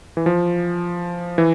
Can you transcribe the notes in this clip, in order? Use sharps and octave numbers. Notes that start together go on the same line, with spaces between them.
E3
F3
E3